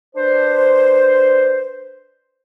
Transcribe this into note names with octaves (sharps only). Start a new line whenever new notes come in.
D4 B4 C5